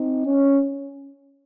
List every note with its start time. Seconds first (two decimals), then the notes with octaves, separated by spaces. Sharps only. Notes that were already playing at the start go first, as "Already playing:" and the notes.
Already playing: C4 D#4
0.24 C#4